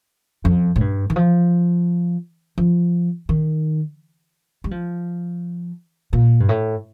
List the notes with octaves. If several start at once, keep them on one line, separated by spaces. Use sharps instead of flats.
F2
A2
G2
D#3
F3
F3
D#3
G3
F3
A#2
G2
A2